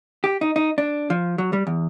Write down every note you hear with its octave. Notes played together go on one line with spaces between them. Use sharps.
G4
D#4
D#4
D4
F3
F#3
G3
E2